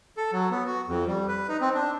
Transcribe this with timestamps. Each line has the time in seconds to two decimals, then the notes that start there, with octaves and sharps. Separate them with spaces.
0.17 A4
0.32 F#3
0.50 B3
0.67 F#4
0.88 F2
1.07 G3
1.28 B4
1.48 D#4
1.61 C4
1.74 D4